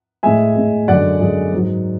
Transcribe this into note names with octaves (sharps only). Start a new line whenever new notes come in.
A2 G#3 E5 G#5
A2 G#3
F#2 D3 G#3 D5 F#5
F#2 D3 G#3
G#2 F#3